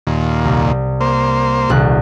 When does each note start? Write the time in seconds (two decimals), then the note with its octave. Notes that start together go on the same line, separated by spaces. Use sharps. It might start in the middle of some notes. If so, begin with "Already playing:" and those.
0.07 D#2 A#2
0.45 C2
1.01 A#3 C5
1.70 D#1 C2 F#6